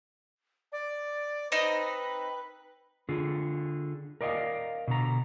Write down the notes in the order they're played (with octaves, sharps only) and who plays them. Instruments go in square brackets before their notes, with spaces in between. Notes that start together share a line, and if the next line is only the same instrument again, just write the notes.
[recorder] D5
[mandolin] C4 D#4 D#5 [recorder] B4
[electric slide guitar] D3 F4 G#4
A#4 D5 D#5 F5
B2 D3 A#5